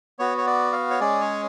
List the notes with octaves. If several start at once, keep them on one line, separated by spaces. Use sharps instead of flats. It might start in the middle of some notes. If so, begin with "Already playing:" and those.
B3 F#4 C#5
C#5
D5
F5
C#5
G#3 C#4 G#4 D5
C#5